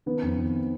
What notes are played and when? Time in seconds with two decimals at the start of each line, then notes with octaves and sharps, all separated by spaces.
0.06 D#3 B3
0.23 F2
0.37 D#3